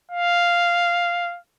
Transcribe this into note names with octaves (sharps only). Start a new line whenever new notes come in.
F5